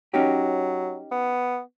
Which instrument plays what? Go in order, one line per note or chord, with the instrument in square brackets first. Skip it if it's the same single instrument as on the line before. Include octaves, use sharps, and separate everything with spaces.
[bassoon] F#3 [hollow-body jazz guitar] C#4 D#4 G4
[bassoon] B3